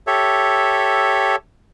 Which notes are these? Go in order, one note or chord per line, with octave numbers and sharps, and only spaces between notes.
G4 A4 C#5 E5